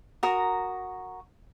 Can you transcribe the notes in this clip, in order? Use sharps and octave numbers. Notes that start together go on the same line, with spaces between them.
F#4 A#4 A#5 D#6